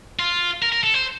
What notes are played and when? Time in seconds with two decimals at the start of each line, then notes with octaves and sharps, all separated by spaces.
0.19 F4
0.62 A#4
0.72 A#4
0.84 A4
0.94 C5